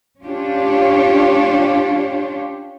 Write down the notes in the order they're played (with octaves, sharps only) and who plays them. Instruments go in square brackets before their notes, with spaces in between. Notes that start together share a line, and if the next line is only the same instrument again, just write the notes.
[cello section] C#4 D4 F4 G4 C#5